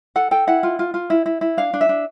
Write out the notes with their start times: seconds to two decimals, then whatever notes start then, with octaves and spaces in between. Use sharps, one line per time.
0.16 A4 F#5
0.31 A4 G5
0.47 E4 F#5
0.63 F4
0.79 F4
0.94 F4
1.10 E4
1.26 E4
1.41 E4
1.57 D4 F5
1.74 D4
1.81 E5
1.89 D4